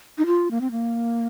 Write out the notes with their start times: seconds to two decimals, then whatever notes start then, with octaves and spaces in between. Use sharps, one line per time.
0.18 D#4
0.26 F4
0.51 A#3
0.61 C4
0.71 A#3